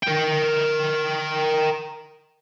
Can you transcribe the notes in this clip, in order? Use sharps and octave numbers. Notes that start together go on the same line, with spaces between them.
A#4 G5